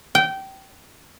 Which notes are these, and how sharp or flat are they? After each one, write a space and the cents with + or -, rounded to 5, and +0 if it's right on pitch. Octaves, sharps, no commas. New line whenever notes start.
G5 -20